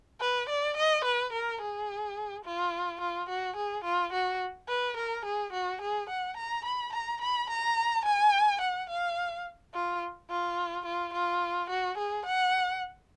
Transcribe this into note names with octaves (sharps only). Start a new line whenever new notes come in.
B4
D5
D#5
B4
A#4
G#4
F4
F4
F#4
G#4
F4
F#4
B4
A#4
G#4
F#4
G#4
F#5
A#5
B5
A#5
B5
A#5
G#5
F#5
F5
F4
F4
F4
F4
F#4
G#4
F#5